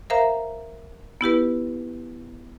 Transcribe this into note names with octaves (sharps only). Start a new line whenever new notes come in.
A#4 C5 E5 F5 A#5
B3 E4 G4 B4